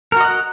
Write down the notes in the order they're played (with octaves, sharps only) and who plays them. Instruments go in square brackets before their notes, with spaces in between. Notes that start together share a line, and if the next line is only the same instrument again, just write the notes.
[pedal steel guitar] A#4
F#4
D#5
F#5